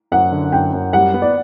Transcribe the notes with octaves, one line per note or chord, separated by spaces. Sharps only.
F#2 F#5
D3
F#2 G5
F#2
G3 F#5
B3
D5